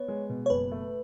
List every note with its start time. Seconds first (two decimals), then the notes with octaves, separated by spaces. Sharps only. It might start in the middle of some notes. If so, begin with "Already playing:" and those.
Already playing: B3 C#5
0.08 G#3
0.29 B2
0.46 C#5
0.50 F#1 B4
0.71 A3